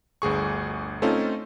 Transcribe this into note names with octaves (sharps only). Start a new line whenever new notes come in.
G1 D2 G#4 C#6
A3 C4 C#4 D#4 F4 A4